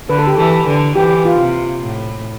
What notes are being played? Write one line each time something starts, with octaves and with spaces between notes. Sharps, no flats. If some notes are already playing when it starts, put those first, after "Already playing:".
D3 B4
A4
G4
E3 A4
D3
E3 G4
F4
C3
A2